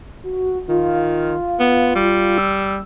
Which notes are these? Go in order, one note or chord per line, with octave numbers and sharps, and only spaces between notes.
F#4
D#3 F4
B3
G3
E6